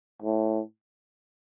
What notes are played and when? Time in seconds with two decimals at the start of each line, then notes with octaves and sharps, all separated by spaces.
0.22 A2